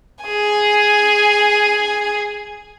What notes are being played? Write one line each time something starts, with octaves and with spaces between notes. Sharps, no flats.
G#4 G#5